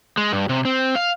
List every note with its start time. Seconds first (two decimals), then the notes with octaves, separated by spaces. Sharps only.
0.17 G#3
0.32 G2
0.49 C3
0.65 C4
0.96 F5